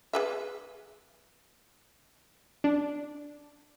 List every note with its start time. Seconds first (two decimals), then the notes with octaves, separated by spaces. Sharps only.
0.13 G#4 B4 E5
2.64 D4